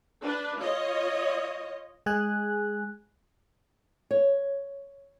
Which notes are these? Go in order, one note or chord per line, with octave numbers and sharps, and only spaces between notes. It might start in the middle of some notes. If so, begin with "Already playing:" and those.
D4 B4
F4 C#5 D#5
G#3 G#4 G#5 F#6
C#5